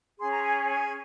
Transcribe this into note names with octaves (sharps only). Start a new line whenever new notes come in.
C#4 G#4 C#5 C6
A#5
G#5
G#5